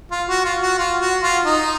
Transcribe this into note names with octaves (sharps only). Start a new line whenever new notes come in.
F4
F#4
F4
F#4
F4
F#4
F4
D#4